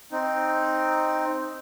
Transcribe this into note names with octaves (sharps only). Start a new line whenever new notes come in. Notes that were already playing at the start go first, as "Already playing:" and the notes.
C4 D#4